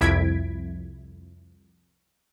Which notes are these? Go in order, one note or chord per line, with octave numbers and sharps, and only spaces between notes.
C2 F2 E4 G#6 B6 D7